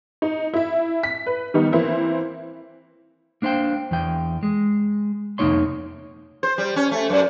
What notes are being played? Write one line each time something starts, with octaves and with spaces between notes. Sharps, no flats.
D#4
E4 E5
B6
B4
D#3 G3 B3 D#4
E3 A#3 C4 E4
A#3 D4 C5 F5 G5
E2 E3 G5
G#3
C2 F2 A#3 D#4 C#5 C6
C5
G3
C#4
A3
F#2